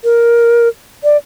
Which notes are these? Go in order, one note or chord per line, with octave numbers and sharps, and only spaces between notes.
A#4
D5